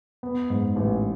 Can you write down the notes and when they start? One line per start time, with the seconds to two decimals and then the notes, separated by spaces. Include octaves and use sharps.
0.23 B3
0.50 G#2
0.76 A1